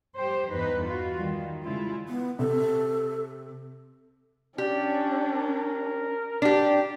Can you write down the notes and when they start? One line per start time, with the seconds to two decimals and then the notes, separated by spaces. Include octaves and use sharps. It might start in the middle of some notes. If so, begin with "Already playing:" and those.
0.18 G3 G4 C5
0.53 E2 G2 G3 D#4 B4
0.85 F4 F#4
1.18 D#3 G3
1.64 C#3 G3 G#3 E4 F4
2.08 B3
2.39 C3 A4
4.58 C#4 D4 G4 D5
5.31 A#4
6.42 D4 G4 D5